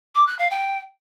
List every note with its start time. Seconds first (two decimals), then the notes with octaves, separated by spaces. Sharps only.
0.15 D6
0.27 F#6
0.39 F5
0.51 G5